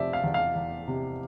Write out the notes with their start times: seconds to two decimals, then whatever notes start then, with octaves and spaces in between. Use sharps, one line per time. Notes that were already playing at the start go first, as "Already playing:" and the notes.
Already playing: F1 C3 F3 C5 D5 E5
0.13 F5
0.24 E2
0.34 F5
0.55 E2
0.87 C3